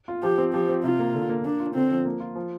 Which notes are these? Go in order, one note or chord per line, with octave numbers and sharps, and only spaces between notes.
F4
F3 G4
C4
F3 G4
C4
C3 F4
A#3
D3
A#3
A#3 D4
F4
D3 C4
F3
A#3
F4
F3